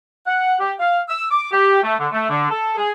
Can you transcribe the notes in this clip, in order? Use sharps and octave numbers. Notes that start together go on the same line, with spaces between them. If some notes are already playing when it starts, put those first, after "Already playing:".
F#5
G4
F5
E6
D6
G4
A3
D3
A3
D3
A4
G#4